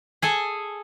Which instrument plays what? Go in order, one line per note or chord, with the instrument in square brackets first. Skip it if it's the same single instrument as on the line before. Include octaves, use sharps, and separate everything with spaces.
[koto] G#4 A4 G#5